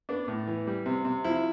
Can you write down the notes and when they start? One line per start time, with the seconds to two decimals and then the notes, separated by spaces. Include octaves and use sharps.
0.09 B3 D4
0.28 A2
0.47 E3
0.67 G3
0.86 C3
1.05 C3
1.25 F3 E4